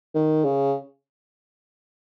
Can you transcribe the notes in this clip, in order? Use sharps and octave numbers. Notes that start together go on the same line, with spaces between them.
D#3
C#3